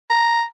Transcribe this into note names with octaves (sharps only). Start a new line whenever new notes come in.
A#5